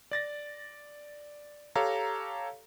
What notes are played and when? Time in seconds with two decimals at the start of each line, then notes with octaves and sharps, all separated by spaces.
0.11 D5 A6 A#6
1.75 G4 A4 C#5 F5 A#5